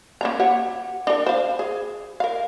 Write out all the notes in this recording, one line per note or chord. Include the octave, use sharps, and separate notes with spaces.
A#3 C#4 A#5
G4 C#5 F#5
D4 A#4
C5 F5
G#4
A#4 F5